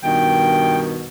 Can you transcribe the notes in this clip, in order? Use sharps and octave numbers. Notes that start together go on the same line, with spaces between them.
G2 B2 D#3 G5